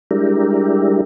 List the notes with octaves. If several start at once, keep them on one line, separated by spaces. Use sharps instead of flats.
G3 G#3 D4 E4 G4 A#4